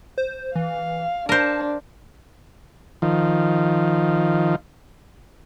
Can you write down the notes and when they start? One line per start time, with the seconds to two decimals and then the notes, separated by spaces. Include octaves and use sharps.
0.18 C5
0.56 E3 F5
1.29 D4 A#4 C5 A5
3.02 D#3 F3